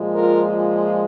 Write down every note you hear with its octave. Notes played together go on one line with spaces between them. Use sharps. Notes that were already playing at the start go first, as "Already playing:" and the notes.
Already playing: A#2 F3 G#3
F4 A#4